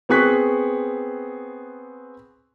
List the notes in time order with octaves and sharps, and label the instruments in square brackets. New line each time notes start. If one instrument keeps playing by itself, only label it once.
[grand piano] B3 C4 G#4 C#6 F#6 B6